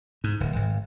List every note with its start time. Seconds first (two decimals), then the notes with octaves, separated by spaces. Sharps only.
0.24 G#2
0.40 D1
0.56 G#1